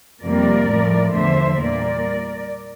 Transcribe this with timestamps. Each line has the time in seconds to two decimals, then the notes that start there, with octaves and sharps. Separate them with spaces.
0.22 F2 C3 G3 A#3 A#4 D5
0.68 A2 F3 A3
1.13 E2 D3 F3 C5 E5
1.59 A#2 G3 A#3 A#4 D5